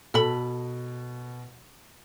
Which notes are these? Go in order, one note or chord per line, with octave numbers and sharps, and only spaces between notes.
B2 A4 B5